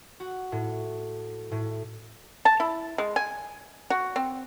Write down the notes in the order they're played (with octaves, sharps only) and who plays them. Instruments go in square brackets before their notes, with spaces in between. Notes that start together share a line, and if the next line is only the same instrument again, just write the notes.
[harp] F#4
A2
A2
[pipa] A5
E4
G#3
G#5
F#4
C4